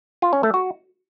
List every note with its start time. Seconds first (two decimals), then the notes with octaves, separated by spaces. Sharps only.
0.22 F4
0.33 C#4
0.43 A3
0.54 F#4